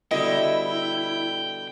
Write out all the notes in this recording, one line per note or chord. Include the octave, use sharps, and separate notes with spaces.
B2 D3 G3 E4 D#5 G5